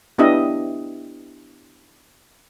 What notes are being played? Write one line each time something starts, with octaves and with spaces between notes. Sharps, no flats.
B3 D4 E4 G4 D#5 E5